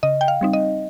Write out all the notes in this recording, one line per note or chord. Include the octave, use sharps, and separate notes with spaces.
C#3 D#5
G5
F5
G3 C4 D#4
D#5